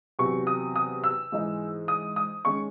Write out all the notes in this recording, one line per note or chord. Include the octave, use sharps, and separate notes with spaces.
E2 C3 F#3 C#6
D#6
D#6
E6
G#2 E3 G#3 D#4
D#6
D#6
D#3 G#3 C#4 C#6